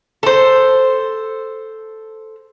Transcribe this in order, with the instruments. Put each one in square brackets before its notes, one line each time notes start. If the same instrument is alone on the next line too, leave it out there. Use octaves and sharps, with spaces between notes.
[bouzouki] A4 C5